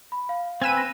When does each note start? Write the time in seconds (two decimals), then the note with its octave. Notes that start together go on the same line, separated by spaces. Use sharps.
0.12 B5
0.29 F5
0.61 C4 B4 G#5 E6 D#7
0.77 A#6